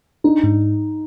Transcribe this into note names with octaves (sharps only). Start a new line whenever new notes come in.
D4 D#4
G#2